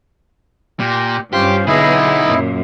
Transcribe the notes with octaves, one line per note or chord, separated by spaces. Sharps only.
A#2 G4
G2 C#4 F4 G4 C5
B2 D3 B3 D#4 E4 G#4
F#2 A#2